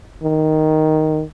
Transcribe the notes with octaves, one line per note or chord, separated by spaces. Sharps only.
D#3